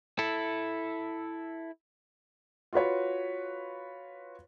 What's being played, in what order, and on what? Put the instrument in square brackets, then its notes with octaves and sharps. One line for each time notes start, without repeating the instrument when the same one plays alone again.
[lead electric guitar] E4 A4
[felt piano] F4 F#4 B4 C#5